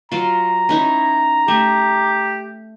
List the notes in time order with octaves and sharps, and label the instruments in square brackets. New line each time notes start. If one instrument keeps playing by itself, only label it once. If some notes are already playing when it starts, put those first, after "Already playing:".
[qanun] F#3 F4 [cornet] A#5
[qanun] C#4 D#4 E4
[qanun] A3 [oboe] G4